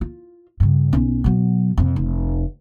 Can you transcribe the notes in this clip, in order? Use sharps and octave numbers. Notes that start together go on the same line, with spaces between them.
F4
G2 C#3
B1 C#4
B2 F#3
F2 C3
F1